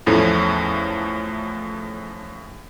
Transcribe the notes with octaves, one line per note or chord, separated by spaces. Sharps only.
E2 A2 F3 A3 C#4